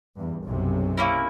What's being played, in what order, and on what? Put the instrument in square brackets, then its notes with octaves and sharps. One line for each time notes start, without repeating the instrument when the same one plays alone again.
[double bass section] E2 G2
B1 F#2 C3
[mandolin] A#3 C#4 E4